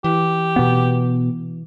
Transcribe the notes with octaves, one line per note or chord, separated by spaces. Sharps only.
E3 G4
B2 B3